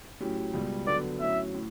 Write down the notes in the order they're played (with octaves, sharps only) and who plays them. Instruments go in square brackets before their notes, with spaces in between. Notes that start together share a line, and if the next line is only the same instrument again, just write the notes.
[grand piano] A2 F#3 C#4 G4
C#2 B2 G3
[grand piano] D3 F#3 B3 D4 [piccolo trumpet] D5
[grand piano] A2 F#3 C#4 [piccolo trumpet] E5
[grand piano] A2